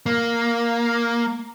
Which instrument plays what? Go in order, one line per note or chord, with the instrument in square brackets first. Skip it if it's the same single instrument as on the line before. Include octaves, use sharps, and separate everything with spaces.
[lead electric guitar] A#3